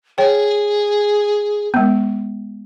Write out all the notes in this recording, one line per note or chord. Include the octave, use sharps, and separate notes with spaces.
G#4 C#5 G5
G#3 B3